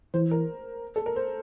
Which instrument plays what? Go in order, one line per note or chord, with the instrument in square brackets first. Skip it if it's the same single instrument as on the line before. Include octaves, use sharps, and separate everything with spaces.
[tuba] E3 [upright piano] C5
[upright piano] A#4
A4
A#4
C5